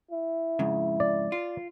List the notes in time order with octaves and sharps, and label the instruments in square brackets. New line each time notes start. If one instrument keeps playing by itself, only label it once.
[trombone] E4
[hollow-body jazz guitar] F2 G#2 C#3
[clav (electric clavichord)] D5
[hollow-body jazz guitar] F4